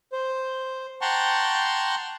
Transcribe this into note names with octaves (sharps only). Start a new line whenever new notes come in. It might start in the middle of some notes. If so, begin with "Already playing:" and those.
C5
F#5 G5 A5 A#5 C6 C#6